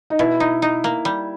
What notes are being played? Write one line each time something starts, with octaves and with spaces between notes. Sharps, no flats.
D#4
B2 E4
D#4
D#4
A#3
G3